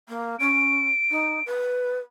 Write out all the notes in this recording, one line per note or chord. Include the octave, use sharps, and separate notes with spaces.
A#3
C#4 D7
D#4
B4